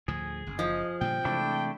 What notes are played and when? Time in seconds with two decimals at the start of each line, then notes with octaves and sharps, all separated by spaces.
0.08 D2 A2 F3 G#4
0.47 F#1
0.59 F3 D#5
1.01 A#2 D3 G3 G5
1.25 C3 E3 G#3 A3 D4 E4